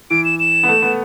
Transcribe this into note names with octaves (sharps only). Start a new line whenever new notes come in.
E3 D7
E7
E7
B3
A3
B3